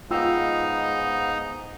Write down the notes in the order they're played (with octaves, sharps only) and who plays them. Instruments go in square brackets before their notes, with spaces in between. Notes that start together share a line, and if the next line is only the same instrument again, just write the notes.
[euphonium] G#2 [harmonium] B3 F5 [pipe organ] D#4 [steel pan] F4 G5 E6